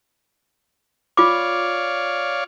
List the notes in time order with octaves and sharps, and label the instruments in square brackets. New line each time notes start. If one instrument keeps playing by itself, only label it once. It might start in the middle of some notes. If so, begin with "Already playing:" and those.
[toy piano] F4 D6 [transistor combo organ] C#5 D5 F5